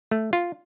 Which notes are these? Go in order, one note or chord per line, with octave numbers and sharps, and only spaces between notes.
A3
F4